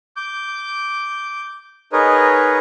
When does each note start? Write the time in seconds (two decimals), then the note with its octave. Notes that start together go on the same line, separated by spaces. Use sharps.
0.16 D6 G6
1.93 D#4 G#4 A#4 B4 C#5 D#5